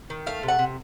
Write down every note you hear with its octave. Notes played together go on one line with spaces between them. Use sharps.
D#3
A3 F5
C3
F#5
C3